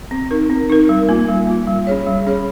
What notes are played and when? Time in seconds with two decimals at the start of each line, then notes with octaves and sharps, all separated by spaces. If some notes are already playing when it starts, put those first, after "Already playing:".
0.11 C4
0.31 D#4 A#4
0.50 C4
0.70 D#4 A#4
0.89 G3
1.09 A#3 F4
1.28 G3
1.47 A#3 F4
1.67 G3
1.87 C#4 G#4 C#5
2.07 G3
2.26 C#4 G#4 C#5